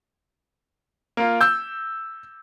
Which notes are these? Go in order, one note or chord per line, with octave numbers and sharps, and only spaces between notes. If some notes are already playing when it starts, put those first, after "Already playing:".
A#3 F4
E6 G6